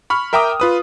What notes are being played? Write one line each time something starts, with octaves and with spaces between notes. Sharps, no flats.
B5 C#6 F6
A#4 E5 G5 A#5 D6 D#6
F4 B4 D#6